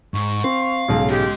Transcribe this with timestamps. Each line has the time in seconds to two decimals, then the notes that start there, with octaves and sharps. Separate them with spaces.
0.14 G#2 C#6
0.44 C4 F5
0.88 B1 G#2 C#3
1.10 G#3 G4